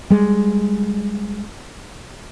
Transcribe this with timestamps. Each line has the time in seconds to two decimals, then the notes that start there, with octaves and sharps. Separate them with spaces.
0.10 G3 G#3